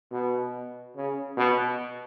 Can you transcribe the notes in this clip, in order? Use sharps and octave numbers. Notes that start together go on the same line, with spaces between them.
B2
C#3
B2